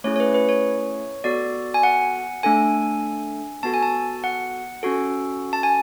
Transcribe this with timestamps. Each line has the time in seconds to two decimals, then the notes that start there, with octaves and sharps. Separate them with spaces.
0.04 A3 C#4 E4 G#4 C#5
0.16 C#5
0.20 B4
0.34 B4
0.49 C#5
1.24 B3 F#4 A4 D5
1.74 G#5
1.83 F#5
2.43 A3 D4 A4 G#5
3.63 B3 F#4 A4 A5
3.74 G#5
3.83 A5
4.24 F#5
4.83 C#4 F#4 A4
5.53 A5
5.63 G#5